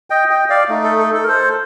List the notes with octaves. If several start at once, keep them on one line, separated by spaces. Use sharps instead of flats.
D#5 G5
D#5 G5
D5 F5
A3 D#4
A4
A4
A4
A#4
A4 C5